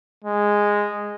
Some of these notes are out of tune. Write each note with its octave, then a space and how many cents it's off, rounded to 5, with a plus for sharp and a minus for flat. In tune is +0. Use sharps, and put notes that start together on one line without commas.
G#3 -10